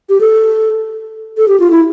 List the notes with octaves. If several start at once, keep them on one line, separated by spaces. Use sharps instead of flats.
G4
A4
A4
G4
F4
E4